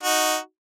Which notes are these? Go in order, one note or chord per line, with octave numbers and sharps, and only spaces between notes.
D#4 F#4